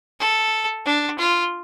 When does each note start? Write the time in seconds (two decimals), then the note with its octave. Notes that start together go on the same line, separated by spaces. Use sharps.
0.20 A4
0.86 D4
1.19 F4